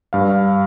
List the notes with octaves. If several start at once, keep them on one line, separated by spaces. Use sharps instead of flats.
G2 F5